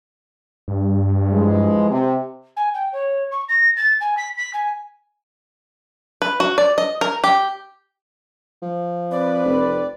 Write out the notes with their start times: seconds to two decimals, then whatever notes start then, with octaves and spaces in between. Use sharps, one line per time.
0.68 G2
1.32 E3 F3 G#3
1.91 C3
2.56 G#5
2.74 G5
2.93 C#5
3.31 C#6
3.49 A#6
3.76 A6
4.00 G#5
4.17 B6
4.37 B6
4.53 G#5
6.22 B4
6.40 F#4
6.58 D5
6.78 D#5
7.01 A#4
7.24 G4
8.62 F3
9.12 C4 B4 D5
9.46 F1